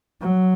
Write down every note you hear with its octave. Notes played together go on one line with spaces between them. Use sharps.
F#3